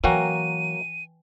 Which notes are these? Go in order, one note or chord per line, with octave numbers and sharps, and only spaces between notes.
E3 F#3 A#3 F#4 B4 G5 G#5 D#7